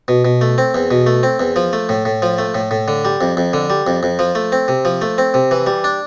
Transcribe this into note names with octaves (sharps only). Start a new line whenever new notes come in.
B2
B2
A3
C4
E2
B2
A3
C4
E2
F3
A3
A2
A2
F3
A3
A2
A2
D3
G3
F2
F2
D3
G3
F2
F2
F3
A3
C4
C3
F3
A3
C4
C3
E3
G3
D4